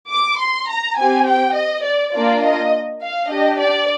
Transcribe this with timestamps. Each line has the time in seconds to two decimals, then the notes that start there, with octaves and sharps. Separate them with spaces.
0.10 D6
0.39 C6
0.68 A#5
0.97 C4 G4 G#5
1.26 G5
1.54 D#5
1.85 D5
2.13 A#3 D4 F4 D5
2.41 D#5
3.00 F5
3.28 D4 G4 D#5
3.58 D5